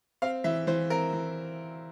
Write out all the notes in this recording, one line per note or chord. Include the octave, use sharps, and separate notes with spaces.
C4 F5
E3 E5
E3 C5
C4 A#4
E3